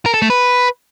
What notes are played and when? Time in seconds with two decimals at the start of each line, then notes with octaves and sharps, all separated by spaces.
0.06 A#4
0.14 A4
0.22 A3
0.30 B4